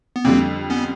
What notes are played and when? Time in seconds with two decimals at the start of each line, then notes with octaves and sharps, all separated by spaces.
0.16 B3
0.25 F2 D3 G3 A#3 C4
0.70 B3 C#4